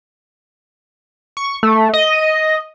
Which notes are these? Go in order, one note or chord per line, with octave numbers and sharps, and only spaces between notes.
C#6
A3
D#5